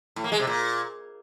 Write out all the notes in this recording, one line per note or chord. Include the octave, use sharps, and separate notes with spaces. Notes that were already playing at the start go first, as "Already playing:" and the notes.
A2
A#3
G#3
C3
A#2